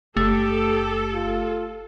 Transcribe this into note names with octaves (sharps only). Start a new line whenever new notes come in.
F#1 A3 G4 A4
F4